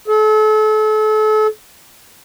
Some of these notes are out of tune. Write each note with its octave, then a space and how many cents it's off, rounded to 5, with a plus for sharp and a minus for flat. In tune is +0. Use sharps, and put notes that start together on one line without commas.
A4 -35